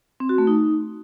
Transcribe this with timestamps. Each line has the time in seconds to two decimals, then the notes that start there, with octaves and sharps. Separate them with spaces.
0.20 C4
0.29 F#4
0.38 A3
0.47 D#4